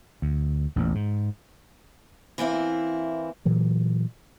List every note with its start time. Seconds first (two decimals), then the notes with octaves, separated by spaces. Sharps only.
0.22 D2
0.76 A1 E2 A#2
0.95 G#2
2.38 E3 A#3 C4 E4
3.45 A#2 E3 F#3